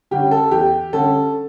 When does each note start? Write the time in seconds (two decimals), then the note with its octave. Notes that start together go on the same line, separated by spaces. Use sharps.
0.11 D3 G3 C#4 G4
0.31 A4
0.51 E2 G4
0.93 D3 G3 C#4 A4